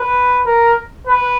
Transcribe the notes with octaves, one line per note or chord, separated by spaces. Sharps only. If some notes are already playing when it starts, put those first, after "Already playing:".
Already playing: B4
A#4
B4